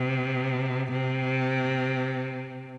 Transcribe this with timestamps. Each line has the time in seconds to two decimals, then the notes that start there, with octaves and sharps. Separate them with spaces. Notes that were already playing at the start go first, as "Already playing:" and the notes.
Already playing: C3
0.91 C3